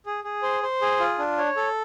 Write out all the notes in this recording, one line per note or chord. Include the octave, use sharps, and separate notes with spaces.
G#4
G#4
C5
C5
G#4
F4
D4
C#5
A4